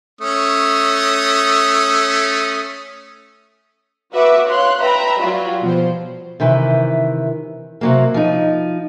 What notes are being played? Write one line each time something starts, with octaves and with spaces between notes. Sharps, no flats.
A3 C#4 D#6
F#4 B4 E5 F#5 D6
C#5 F5 C6 F#6
B4 E5 G5 A#5 B5
F#3 G3 F4 F#4
B2 F3 C5
C3 D#3 E3
C3 F#3 A#3
F3 D#4